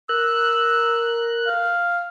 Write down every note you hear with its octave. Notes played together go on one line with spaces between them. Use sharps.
A#4 E6 F#6
F5